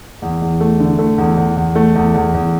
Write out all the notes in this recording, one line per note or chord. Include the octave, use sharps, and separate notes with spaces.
E2
E2
A3
D3
A3
E2
E2
E2
A3
E2
E2
E2